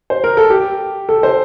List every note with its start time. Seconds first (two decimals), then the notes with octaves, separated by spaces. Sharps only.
0.10 C5
0.24 A#4
0.37 A4
0.50 G4
1.09 A4
1.23 C5